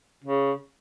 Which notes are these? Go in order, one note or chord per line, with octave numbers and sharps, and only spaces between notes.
C#3